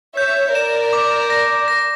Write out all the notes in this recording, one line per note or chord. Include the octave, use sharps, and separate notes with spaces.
C#5 E5 G6
A#4 D5 E7
D6
A#6
A#6